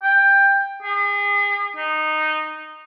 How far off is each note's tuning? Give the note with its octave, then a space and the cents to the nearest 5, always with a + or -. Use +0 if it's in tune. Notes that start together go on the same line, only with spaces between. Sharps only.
G5 +15
G#4 -35
D#4 -10